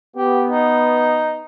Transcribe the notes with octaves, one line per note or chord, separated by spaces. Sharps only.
B3 G4
D#4